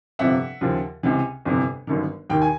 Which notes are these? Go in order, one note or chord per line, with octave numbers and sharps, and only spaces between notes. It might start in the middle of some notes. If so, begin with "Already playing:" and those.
G1 F2 C3 F3 E5 F#5
D#2 C#3 F3
C#2 C3 E3
G1 F2 C3 E3
G1 F#2 D#3
D#2 D#3 G5
G#5